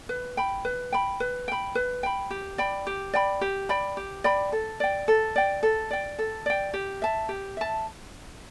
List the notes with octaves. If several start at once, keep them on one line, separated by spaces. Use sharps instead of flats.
B4
G5 B5
B4
G5 B5
B4
G5 B5
B4
G5 B5
G4
D5 G5 B5
G4
D5 G5 B5
G4
D5 G5 B5
G4
D5 G5 B5
A4
D5 G5
A4
D5 G5
A4
D5 G5
A4
D5 G5
G4
E5 A5
G4
E5 A5